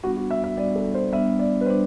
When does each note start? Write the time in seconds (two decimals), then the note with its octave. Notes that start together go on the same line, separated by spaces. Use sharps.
0.03 G3 B3 D4 F#4
0.17 F#4
0.31 E5
0.44 E5
0.57 G3 B3 D4 D5
0.76 A4
0.95 C5
1.12 G3 B3 D4 E5
1.39 D5
1.61 B4
1.66 G3 B3 D4 C5